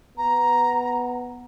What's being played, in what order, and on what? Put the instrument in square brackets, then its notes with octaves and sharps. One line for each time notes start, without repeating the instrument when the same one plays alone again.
[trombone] B3 [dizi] A#5